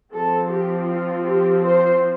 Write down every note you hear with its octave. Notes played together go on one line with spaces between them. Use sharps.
F3 C4 A4
G4
F4
G4
C5